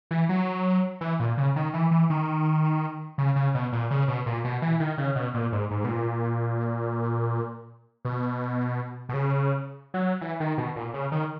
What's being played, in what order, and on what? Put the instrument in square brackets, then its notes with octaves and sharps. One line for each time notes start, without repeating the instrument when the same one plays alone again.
[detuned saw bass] E3
F#3
E3
A#2
C#3
D#3
E3
E3
D#3
C#3
C#3
B2
A#2
C#3
B2
A#2
B2
E3
D#3
C#3
B2
A#2
G#2
G#2
B2
A#2
B2
B2
C#3
F#3
E3
D#3
B2
A#2
C#3
D#3